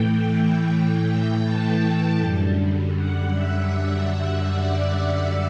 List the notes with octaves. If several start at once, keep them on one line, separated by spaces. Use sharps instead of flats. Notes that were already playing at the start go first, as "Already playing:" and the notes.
Already playing: A2 E3 A3 G5
G5
G5
A5
G5
F#2 D3 G3
F#5
E5
F#5
D5